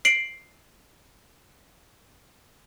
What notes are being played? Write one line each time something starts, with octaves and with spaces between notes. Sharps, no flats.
C7 D7 F#7